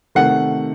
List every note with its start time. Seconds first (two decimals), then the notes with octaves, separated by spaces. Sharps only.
0.15 C3 D#3 A3 F#5